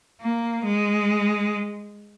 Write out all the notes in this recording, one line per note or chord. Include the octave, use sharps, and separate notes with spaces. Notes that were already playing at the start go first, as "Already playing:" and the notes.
A#3
G#3